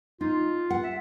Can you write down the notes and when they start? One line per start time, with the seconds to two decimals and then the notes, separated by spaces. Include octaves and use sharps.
0.21 D#4 F4
0.70 F#5
0.83 E5